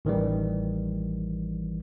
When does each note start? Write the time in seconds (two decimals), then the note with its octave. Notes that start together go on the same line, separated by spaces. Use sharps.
0.05 A1 D#3 E3 G3